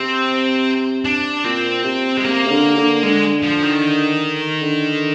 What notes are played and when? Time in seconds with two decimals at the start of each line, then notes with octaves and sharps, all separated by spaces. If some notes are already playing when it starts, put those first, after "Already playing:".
Already playing: C3 C4
1.05 D4
1.44 A#2 C4
1.84 C3
2.17 G#3
2.24 C3 A#3
2.46 C3
2.50 D3
2.77 D3
3.03 D3 G#3
3.43 F3
3.63 D#3
4.62 D3